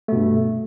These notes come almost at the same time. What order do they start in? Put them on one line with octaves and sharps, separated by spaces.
A3 B2 G2